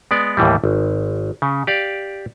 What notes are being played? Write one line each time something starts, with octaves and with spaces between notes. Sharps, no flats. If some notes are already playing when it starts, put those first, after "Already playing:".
G#3 B3 D5
D#2 A2 E3 G3
G#1
C#3
G4 D5 F5